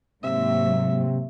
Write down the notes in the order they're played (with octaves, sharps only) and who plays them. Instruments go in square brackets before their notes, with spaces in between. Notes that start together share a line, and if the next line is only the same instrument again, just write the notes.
[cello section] G#2 F#3 A#3 [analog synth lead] C3 [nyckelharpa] E5